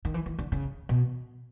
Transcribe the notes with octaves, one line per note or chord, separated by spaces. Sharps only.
D#3
E3
E3
D3
C#3
B2